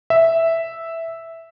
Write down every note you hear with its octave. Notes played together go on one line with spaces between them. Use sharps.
E5